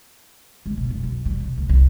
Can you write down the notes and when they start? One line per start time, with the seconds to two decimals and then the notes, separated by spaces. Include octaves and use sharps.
0.66 G#3
0.77 B2
0.90 F#1
1.03 B1
1.26 G3
1.40 C3
1.57 D2
1.69 C2